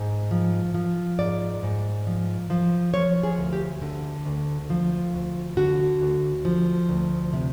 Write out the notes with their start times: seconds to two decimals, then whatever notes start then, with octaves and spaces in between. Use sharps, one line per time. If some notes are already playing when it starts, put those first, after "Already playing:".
Already playing: G#2
0.31 F3
0.74 F3
1.19 G#2 D5
1.63 G#2
2.07 F3
2.50 F3
2.94 F3 C#5
3.23 G#4
3.38 D2
3.53 G4
3.82 D3
4.25 D2
4.70 F3
5.14 D2
5.57 D3 F#4
6.01 D2
6.45 F3
6.89 D2
7.33 C3